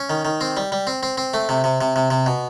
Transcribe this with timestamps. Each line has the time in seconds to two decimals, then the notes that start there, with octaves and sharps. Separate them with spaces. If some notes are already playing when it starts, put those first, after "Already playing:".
Already playing: C#4
0.10 D#3
0.25 D#3
0.41 C4
0.57 G3
0.72 G3
0.87 C4
1.03 C4
1.17 C4
1.34 A3
1.49 C3
1.64 C3
1.81 C3
1.96 C3
2.10 C3
2.26 B2